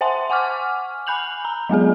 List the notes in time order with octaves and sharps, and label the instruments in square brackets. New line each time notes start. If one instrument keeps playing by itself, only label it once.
[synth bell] C5 E5 F#5 G#5 A5 C6
F#5 G#5 C#6 D6 F6
G#5 B5 F#6 G6 F7 F#7
A#5
F#3 G#3 B3 G#4